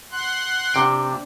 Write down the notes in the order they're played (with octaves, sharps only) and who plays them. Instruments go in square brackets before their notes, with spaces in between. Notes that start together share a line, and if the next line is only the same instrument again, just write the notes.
[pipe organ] F#5 C6 F#6
[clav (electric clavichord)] C3 G5 [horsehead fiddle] C4 D4